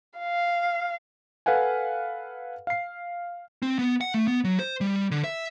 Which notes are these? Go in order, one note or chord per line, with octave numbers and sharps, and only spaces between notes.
F5
A4 B4 F5 F#5 G#5
F5 C7
C4
B3
F#5
A3
B3
F#3
C5
G3
D3
E5